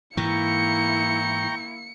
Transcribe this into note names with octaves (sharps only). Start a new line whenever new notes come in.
G#2 E3 A#3 E4 G5 A#5 C#6 C#7